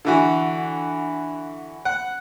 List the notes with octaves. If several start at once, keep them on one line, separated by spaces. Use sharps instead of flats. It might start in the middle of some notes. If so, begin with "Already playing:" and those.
D3 E3 F#4
F#5